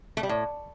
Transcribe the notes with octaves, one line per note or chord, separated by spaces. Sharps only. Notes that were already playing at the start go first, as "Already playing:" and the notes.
A3
G3
A2